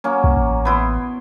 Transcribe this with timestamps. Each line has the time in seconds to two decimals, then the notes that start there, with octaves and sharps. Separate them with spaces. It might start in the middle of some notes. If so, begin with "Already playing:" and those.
0.04 F#3 A#3 C#4
0.24 C2
0.37 A1
0.65 B3 E4 C6